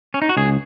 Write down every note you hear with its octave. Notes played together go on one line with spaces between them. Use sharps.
C#4
D#4
F#4
C#2 G#4